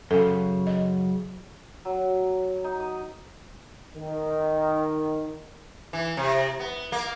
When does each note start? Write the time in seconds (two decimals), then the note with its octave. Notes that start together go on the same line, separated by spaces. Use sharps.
0.11 F#2 C#3 A4
0.67 D#5
1.85 F#3
2.64 D#4
2.80 D#6
3.96 D#3
5.93 E3
6.17 C3
6.59 B3
6.92 A#3